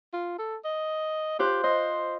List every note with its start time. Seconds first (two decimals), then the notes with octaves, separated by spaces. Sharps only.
0.13 F4
0.39 A4
0.65 D#5
1.39 F4 G4 C5 F#6
1.64 C5 D#5